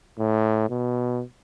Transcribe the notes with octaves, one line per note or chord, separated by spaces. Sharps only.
A2
B2